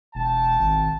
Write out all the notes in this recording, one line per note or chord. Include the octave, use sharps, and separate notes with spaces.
E1 G5 A5
G#1